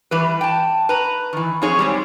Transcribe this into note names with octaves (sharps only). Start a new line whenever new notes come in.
E3 G3 B4
G5 A5
B4 A#5
D#3 E3
F2 C4 D#4 G#4 C#5
G3 G#3 C4